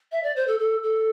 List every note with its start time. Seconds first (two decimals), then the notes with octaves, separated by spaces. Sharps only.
0.12 E5
0.23 D5
0.36 C5
0.47 A4
0.59 A4
0.83 A4